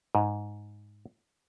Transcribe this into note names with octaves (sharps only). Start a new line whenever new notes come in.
G#2